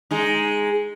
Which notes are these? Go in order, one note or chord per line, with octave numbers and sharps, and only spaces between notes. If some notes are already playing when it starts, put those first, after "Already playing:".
G#3 D#4